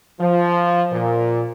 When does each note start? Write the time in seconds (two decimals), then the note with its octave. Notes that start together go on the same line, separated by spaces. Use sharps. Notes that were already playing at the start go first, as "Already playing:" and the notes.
0.20 F3
0.92 A#2